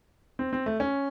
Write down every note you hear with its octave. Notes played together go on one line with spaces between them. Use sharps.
C4
C4
A3
C#4